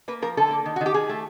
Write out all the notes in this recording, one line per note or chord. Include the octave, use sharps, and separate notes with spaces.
A#3 B4
F3 A#4
D3 A4
A#3
D#3
F#4
D#3
G4
D#3 G#4
A3